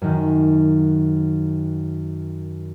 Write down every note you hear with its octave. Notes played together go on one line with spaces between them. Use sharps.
F#2 D#3